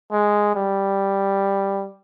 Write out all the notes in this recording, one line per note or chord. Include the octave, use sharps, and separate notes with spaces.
G#3
G3